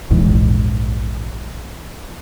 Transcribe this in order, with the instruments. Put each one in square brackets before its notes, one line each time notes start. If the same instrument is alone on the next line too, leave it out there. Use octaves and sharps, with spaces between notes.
[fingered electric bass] A#1 E2 G#2